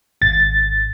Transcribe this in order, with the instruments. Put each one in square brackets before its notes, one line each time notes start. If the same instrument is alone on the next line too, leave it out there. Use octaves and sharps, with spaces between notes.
[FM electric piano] G#1 A6